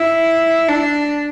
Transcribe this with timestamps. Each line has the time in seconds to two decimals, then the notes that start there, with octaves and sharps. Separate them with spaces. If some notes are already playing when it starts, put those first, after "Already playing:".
Already playing: E4
0.68 D4